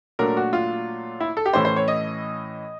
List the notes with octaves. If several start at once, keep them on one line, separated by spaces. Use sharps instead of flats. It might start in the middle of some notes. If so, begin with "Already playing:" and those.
A#2 F#3 A3 D4 A#4
F#4
F4
E4
A4
G4
A2 E3 A3 C#4 C5
C5
C#5
D#5